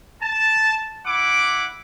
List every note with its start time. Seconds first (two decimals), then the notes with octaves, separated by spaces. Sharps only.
0.22 A5
1.06 E4 F#5 D6